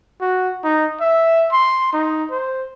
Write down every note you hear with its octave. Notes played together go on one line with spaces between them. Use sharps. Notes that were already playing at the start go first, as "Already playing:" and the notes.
F#4
D#4
E5
C6
D#4
C5